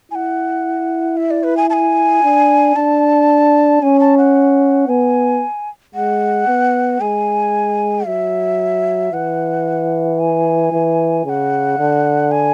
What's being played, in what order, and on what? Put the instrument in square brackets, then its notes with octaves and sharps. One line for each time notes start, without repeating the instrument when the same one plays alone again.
[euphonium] E4 [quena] F#5 G#5
[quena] E5
D5
B4
G#5
A5
G#5
[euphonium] D4
[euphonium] D4 [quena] A5
[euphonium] C#4 [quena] G#5
[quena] A5
F#5
[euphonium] B3 [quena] G#5
[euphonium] G#3 [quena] F#5
[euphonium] B3
[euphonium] G#3 [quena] G#5
[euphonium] F#3 [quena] E5
[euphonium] E3 [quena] F#5
[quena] G#5
[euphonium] E3
[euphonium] C#3 [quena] G#5
[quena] F#5
[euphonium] D3
[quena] G#5